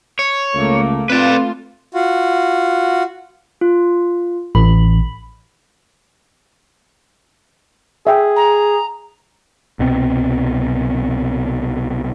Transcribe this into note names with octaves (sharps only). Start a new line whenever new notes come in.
C#5
C#2 A3 A#3
A3 C4 F4 B4 D5
F4 F#4
F4
A1 B5
G#4 E5 G5
A#5
C2 B2 C4